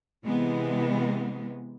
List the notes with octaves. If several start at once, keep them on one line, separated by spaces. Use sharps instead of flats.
C3 E3 G#3 B3